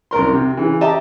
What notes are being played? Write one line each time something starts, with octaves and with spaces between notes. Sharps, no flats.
C2 F#2 A#4 C6
C3
C#3 E3
G4 D#5 E5 A5 A#5